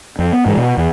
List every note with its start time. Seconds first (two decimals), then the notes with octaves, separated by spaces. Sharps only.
0.19 F2
0.33 B3
0.46 G#2 E3 G#3
0.57 B2
0.77 E2